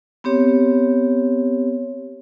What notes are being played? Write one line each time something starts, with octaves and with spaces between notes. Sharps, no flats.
B3 C4 G4 C#5